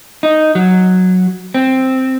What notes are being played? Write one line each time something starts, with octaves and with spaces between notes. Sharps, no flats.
D#4
F#3
C4